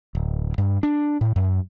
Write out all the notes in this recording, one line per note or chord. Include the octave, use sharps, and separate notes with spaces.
D1
G2
D4
A2
F#2